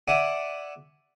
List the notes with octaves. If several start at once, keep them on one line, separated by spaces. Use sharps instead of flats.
D5 E5 F#5 G#5